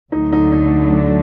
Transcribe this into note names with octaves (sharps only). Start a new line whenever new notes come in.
D2 D3 F#3 A3 D#4
D#4
D#4
D4